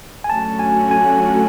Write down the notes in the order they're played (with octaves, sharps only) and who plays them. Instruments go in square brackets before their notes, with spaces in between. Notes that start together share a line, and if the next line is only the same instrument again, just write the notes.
[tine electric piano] G#5
[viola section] D3 F#3 A3 C#4 F#4 [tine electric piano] A5
[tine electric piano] G#5
G#5